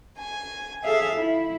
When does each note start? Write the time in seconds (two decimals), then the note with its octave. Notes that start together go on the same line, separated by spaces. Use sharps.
0.19 G#5
0.84 G#4 A4 E5 F5
1.15 E4